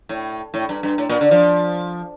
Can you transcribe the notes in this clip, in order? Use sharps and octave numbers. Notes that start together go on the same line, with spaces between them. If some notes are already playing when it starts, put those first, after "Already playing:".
A2
A2
G2
G2
A2
A#2
D3
F3